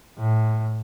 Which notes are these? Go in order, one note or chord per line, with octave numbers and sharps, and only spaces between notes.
A2